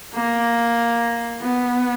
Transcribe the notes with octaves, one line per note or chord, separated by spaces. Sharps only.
A#3
B3